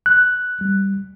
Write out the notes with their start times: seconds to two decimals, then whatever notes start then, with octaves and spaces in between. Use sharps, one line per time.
0.06 F#6
0.61 G3